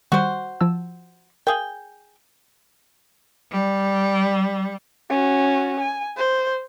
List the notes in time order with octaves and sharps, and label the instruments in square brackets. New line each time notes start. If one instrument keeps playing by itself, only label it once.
[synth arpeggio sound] D#3 G3 [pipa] F#4 C5
[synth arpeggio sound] F3 A5 E6
[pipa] G#4 G5 [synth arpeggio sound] A#4 F5
[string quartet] G3
[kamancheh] C#4 F#4
G#5
C5